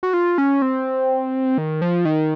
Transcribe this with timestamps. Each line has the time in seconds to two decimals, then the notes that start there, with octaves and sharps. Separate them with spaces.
0.03 F#4
0.13 F4
0.38 C#4
0.62 C4
1.58 D#3
1.82 F3
2.05 D#3